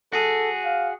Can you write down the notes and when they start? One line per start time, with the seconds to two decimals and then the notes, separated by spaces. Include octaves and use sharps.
0.13 F#4 G#4 A4
0.65 F5